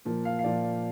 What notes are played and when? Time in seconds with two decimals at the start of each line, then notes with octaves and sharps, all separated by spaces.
0.05 A#2 F3 A#3
0.25 F5
0.39 F5
0.44 A#2 F3 A#3 D5